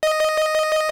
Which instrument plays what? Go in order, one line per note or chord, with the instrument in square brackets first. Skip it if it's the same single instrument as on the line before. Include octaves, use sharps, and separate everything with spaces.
[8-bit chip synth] D#5